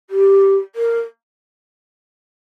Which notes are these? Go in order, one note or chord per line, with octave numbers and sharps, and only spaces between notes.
G4
A#4